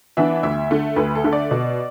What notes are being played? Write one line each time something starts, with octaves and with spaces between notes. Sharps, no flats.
E3 B3 D4 E5
D2 E5
D3 A3
D2 B4
A4
D3 A3
D5
B2